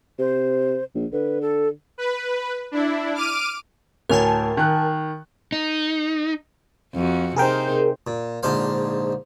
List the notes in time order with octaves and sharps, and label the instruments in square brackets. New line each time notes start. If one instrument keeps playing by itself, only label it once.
[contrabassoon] C3 [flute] C5
[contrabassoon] A#1
[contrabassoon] D3 [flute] B4
[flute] A4
[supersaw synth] B4
D4 E4
D6 F6 D7 D#7
[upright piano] D2 A2 C#5 [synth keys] A#4 G#5 A5
[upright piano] D#3 F#6
[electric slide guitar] D#4
[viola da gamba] F2 F#4
[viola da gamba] C3 D#4 C5 [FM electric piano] G#4 A#4 G5
[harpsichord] A#2
A#1 G#2 D3 C5 F5